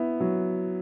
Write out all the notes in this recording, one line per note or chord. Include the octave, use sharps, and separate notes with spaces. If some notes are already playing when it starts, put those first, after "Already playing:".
Already playing: B3 E4
F#3